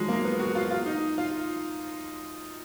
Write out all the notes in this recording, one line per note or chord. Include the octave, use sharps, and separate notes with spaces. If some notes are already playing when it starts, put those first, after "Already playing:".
Already playing: D#3 F3 F#3 G#3
A#3
B3
F#4
F4
F4
D#4
F4